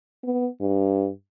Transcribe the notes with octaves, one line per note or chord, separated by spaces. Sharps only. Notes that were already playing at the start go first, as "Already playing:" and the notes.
B3
G2